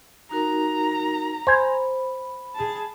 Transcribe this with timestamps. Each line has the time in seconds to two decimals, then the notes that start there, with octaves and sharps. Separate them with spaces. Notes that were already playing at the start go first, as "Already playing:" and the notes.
0.31 D#4 F#4 A#4 A#5
1.47 C5 G#5 B5
2.55 G#4 A5